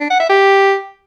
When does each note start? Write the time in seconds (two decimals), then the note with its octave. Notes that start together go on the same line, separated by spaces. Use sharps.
0.01 D4
0.10 F#5
0.20 E5
0.30 G4